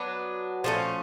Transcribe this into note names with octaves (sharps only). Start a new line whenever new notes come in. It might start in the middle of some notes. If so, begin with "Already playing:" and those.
Already playing: F#3 B3 D4
F3 A3 C#4